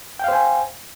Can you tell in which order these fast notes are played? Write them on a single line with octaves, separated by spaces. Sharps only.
G5 F5 C5 G#5